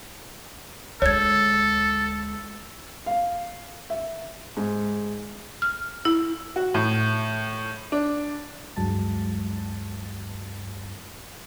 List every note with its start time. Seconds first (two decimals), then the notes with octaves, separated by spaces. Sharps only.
1.02 D2 G#3 A4 C#5 G#6
3.06 F5
3.90 E5
4.57 G#2
5.62 F6
6.05 E4
6.56 F#4
6.74 A2
7.92 D4
8.76 D2 G2 F#3 G#3 A5 A6